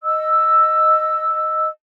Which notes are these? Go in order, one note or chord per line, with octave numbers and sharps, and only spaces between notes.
D#5 E6